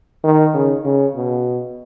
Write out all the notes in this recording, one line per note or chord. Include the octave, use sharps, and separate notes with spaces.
D#3
C#3
C#3
B2